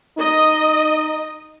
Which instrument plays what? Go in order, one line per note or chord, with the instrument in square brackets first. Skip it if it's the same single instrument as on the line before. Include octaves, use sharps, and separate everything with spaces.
[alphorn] D#4 [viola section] D#5